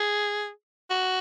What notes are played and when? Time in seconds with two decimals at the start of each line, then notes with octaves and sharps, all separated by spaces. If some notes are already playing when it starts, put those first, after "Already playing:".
Already playing: G#4
0.91 F#4